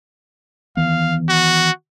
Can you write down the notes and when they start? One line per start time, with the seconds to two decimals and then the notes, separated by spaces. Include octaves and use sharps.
0.77 D#3 E3 B3 F5
1.29 F#4